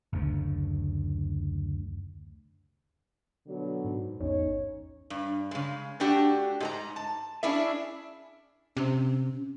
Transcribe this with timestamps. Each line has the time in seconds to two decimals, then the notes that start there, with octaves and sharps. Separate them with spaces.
0.13 F#1 D2
3.47 B2 D3 F#3
3.84 G#2
4.20 A1 E2 C#4 D#4 C#5
5.10 G2
5.51 C#3 G#3
6.00 A3 D4 F#4 G4
6.60 G#2 G#4 A#5
6.96 A5
7.43 C#4 D4 E4 G#4 E5
8.77 C3 C#4